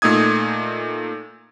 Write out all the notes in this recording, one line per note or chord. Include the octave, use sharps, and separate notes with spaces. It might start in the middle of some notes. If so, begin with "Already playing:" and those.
A#2 A3 D#4 D#6 G#6